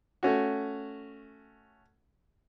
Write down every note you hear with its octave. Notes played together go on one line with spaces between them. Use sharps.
A3 C#4 F#4